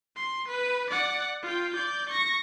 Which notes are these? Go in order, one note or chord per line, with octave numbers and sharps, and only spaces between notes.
C6
B4
D5 F#5
F4 G5
D5 G6
C#6 A#6